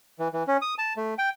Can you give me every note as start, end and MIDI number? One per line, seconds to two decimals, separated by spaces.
0.19 0.28 52
0.33 0.43 52
0.47 0.57 61
0.62 0.74 87
0.78 0.93 81
0.97 1.14 57
1.18 1.29 79